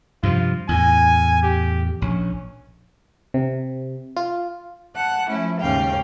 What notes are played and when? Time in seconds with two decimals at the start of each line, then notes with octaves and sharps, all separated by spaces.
0.23 G2 C3 F3 F4
0.69 E2 A2 G#5
1.43 G4
2.02 A#1 C#4
3.34 C3
4.17 F4
4.95 F#5 A5 F#6
5.29 F3 A3 C#4 E4
5.60 D#2 G#2 C#3 C#4 F5 G5